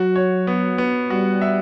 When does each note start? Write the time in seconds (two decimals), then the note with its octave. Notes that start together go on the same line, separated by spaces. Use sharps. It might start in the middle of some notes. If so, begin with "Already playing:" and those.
Already playing: F#3 F#4
0.16 C#5
0.47 B3
0.78 B3
1.10 G3 F#4
1.41 E5